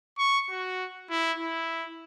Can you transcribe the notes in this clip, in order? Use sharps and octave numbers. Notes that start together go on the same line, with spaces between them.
C#6
F#4
E4
E4